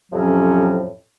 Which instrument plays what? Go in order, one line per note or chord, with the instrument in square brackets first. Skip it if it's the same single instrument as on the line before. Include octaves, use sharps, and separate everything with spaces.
[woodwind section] F2 A2 C3 F3 F#3 C#4